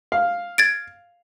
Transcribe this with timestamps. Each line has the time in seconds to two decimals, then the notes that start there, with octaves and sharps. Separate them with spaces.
0.12 F5
0.58 G#6 A6 D7